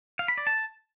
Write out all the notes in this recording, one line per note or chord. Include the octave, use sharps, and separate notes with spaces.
F5
B5
D5
A5